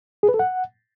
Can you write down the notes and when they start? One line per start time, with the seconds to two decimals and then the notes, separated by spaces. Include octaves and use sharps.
0.23 G#4
0.29 B4
0.34 A4
0.39 F#5